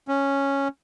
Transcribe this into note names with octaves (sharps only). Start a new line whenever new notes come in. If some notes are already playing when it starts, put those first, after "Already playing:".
C#4